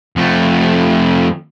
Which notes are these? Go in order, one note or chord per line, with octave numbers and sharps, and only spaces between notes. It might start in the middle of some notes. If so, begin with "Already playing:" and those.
F2 A3